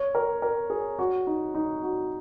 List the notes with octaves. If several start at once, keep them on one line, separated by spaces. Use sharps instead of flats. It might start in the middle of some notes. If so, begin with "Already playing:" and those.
Already playing: C#5
A#4
A#4
G#4
F#4
D#4
D#4
F#4